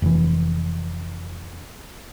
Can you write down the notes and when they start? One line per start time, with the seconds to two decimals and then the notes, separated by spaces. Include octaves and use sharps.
0.02 F1 E3